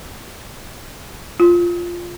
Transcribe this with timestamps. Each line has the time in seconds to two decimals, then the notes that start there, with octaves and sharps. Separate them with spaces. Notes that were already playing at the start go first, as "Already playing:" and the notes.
1.40 F4